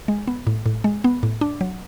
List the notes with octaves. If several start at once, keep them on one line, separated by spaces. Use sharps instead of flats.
G#3
B3
A2
A2
G#3
B3
A2
D4
F#3